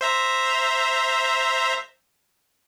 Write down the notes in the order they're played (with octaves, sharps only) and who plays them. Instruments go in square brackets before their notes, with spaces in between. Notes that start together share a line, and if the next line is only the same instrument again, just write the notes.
[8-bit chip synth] C5 E5 A#5